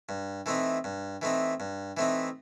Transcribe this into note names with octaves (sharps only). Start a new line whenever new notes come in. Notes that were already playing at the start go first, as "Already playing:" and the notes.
G2
E3 A3 C4 D#4
G2
E3 A3 C4 D#4
G2
E3 A3 C4 D#4